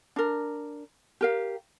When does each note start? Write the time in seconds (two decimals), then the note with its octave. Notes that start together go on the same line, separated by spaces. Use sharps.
0.16 D4 A#4
1.21 G4 A#4 F5